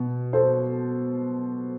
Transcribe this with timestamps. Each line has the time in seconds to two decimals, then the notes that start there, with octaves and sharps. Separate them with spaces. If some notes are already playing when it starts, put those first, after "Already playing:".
Already playing: B2
0.33 A4 C5